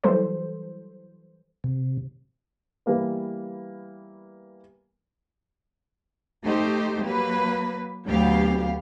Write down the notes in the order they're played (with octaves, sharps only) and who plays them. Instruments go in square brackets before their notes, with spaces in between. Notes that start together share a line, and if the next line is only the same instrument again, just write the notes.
[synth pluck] E3 F#3 G3 A4 C5
[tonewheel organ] C3
[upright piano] E3 G3 A#3 B3
[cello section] A3 D#4 G4 C5
F#3 A#3 B4
D2 F#3 B3 G4 F5